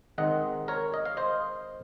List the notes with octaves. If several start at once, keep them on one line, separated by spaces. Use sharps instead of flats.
D#3 G#3 C4 D#4 D#5 F#5
A#4 C#5
D#5
F5
C5 D#5